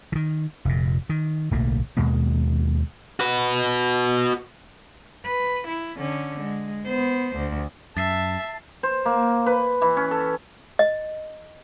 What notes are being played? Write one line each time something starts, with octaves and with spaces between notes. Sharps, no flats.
D#3 E3
F1 A#2
D#3
D1 B1 A3 A#3
D#2 B2 G#3 A#3
F#4 B4
B4
E4
D3 C#4
G#3
B3 C5
D2
F#2 E5 A5 A6 C7
C5
A#3
B4
E3
C#4
A4
D#5